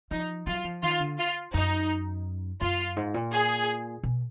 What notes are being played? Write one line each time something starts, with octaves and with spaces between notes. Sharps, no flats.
F3 D#4
F#3 F4
F3
D#3 F4
D3
F4
F#2 D#4
F#2 F4
G#2
A#2
G#4
B2